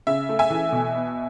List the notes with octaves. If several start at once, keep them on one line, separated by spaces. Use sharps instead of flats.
C#3 E5
A3
E5 G#5
E3
B2
B3